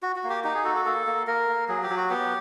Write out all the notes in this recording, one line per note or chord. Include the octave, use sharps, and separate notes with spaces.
F#4
F#4
A#3
G4
D#4 G4
G#4
F#4 A4
A4
A#3 A4
A#3
A#3 A#4
A#3
F#3 G#4
G4
F#3
F#4
B3 G4